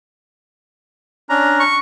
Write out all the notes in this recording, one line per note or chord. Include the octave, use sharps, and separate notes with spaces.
C#4 D4 A#5
C#6